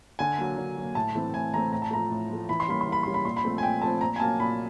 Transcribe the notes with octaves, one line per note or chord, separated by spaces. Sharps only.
D3 G#5
F#3 A#3
D3
F#3 A#3
A2 A5
E3 A3 C4
A2 G#5
E3 A3 C4 A#5
A2 A#5
A5
F3 A3 A#5
A2
F3 A3
E3 B5
C6
G3 A#3 C#4 B5
C6
E3
B5
G3 A#3 C#4 C6
B5
A#2 C6
B5
F3 A3 C4
G#5
A#2 G5
F3 A3 C4 A5
A#2 A#5
G#5
F#3 A#3 C#4 A5
A#2 B5